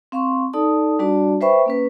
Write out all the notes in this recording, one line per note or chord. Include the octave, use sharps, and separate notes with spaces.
C4 F5 C6 C#6
D#4 A4 D5 A5 D#6
G3 D4 F#4 D5 A5
B4 C5 E5 G5 B5 C#6
A#3 C#4 B4